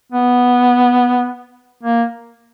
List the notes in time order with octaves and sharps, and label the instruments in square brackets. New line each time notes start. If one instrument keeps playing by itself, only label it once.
[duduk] B3
A#3